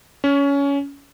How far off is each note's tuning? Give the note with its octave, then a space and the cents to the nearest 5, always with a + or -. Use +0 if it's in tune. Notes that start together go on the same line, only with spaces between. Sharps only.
C#4 +20